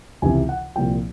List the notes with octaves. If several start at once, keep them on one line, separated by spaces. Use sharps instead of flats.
C#2 C3 E3 G#5
F#5
C2 A#2 F3 G5